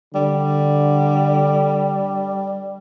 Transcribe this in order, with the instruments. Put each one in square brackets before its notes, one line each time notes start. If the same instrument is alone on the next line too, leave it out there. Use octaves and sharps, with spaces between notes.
[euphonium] D3 [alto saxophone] G3